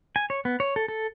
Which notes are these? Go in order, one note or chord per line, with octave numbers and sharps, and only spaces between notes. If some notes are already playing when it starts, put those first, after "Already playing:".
G#5
C#5
B3
C#5
A4
A4